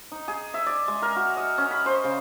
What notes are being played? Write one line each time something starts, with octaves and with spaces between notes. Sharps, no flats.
D#4
G#4
E5
D5
G#3
A#4
F#4
D#5
C#4
B5
C5
C#3